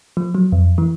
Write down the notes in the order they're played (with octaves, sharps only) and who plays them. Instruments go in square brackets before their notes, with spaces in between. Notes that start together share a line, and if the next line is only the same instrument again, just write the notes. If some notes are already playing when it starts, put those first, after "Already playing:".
[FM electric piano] F3
F#3
F2
E3